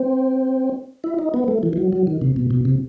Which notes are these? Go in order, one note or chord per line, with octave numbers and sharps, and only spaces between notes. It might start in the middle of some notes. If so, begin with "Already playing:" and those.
Already playing: C4
E4
D#4
B3
A3
E3
E3
F#3
F#3
D#3
C3
B2
B2
C3